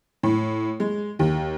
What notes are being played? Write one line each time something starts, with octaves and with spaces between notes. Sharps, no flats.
A2
G#3
D#2